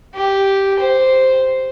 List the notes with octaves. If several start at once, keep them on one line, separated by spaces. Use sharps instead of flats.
G4
C5